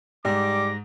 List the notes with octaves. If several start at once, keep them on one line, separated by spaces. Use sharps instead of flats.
G#2 G3 D6 A#6